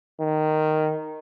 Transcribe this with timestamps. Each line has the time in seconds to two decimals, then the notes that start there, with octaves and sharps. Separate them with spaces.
0.21 D#3